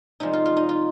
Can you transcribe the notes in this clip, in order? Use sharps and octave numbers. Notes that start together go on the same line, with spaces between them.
C3 F3 G#3 D#4
F4
F4
D#4
F4